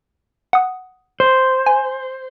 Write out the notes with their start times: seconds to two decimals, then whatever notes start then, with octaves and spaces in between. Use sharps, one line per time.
0.53 F#5 D#6
1.20 C5
1.66 G#5